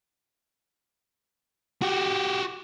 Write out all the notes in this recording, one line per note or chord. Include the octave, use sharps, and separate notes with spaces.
F#4 G4